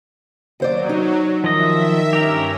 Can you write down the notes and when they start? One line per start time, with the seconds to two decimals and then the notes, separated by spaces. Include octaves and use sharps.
0.60 D#2 F#3 C5 D5
0.89 D#4
1.44 D#3 F3 D#5 E5
2.13 G2 C#4 G4 A#4